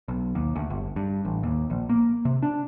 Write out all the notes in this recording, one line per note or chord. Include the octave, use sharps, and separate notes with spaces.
B1
D#2
D2
G1
G2
A1
D#2
A#1
A#3
C3
D4